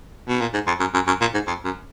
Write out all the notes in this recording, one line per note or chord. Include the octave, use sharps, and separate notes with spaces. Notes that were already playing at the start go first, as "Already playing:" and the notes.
B2
A#2
G#2
F2
F#2
F#2
F#2
A#2
G#2
F2
F#2